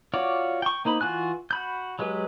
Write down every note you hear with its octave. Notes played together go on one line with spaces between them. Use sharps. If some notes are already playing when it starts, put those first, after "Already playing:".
F4 F#4 C#5 D5
G5 C#6
A#3 D#4 C5 B5
E3 F4 F#4 G#5 F#6
F#4 B5 G6
F#3 G#3 G4 B4